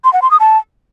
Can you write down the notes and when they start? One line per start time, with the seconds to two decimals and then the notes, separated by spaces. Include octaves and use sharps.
0.04 C6
0.13 F#5
0.22 C6
0.31 D#6
0.40 A5